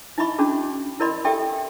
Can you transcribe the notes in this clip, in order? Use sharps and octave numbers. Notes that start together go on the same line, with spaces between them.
D#4 E4 D#5 E5 B5 C#6
C#4 D4 F#4 G#4
E4 A#4 D5 D#5 B5 C6
G4 A4 D5 E5 G5